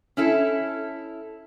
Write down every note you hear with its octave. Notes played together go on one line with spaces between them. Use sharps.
C#4 E4 A4